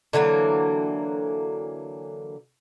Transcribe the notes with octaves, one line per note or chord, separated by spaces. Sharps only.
D3 E3 F#3 A#3